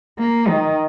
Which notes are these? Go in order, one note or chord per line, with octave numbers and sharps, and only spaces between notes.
A#3
D#3